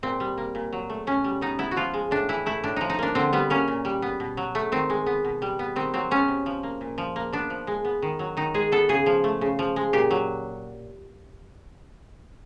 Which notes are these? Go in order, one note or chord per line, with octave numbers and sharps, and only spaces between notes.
A#2 C4
G3
A#3
A#2
F#3
A3
B2 C#4
G3
B3 D#4
B3 E4
F#4
F3 F4
G#3
A2 D4
E3 E4
A3 E4
A2 D4
F3 D#4
D#4
A#3 D4
D3 C4
G3 B3
A#3 C#4
A#2
G3
B3
B2
F#3
A3
D#3 C4
G#3
B3
B2
G3
B3
D#3 C4
F#3 C4
B3 C#4
C3
F3
A#3
A#2
F3
A#3
B3 D4
F3
G#3
B3
D#3
F#3
D#3 D#4
G#3 G#4
B3 A4
C#3 G#4
F3
A3
C#3
F3
G#3
A#2 G4
F#3